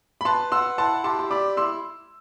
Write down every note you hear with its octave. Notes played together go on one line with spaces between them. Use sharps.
B5
B4 A5 C6
F#5 C6 E6
E4 A5 C6
G4 A5 C6
C6
D5 B5 D6
E4 C6 E6